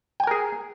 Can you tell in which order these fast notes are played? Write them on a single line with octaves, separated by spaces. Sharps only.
G5 G#5 A#4 G#4